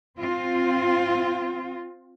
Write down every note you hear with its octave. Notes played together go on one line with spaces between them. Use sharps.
C4 F4